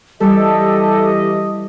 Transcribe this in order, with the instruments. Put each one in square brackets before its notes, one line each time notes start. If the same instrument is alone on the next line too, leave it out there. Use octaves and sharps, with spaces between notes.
[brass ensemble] E3 D#5 [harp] G3 [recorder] G4 [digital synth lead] A4